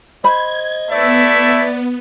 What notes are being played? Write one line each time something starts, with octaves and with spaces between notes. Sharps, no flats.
C5 D#5 B5 G#6
A3 B3 E4 D5 E5